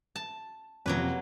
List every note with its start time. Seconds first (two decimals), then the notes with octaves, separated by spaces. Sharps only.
0.16 A5
0.86 F2 C3 F#3 A#3 B4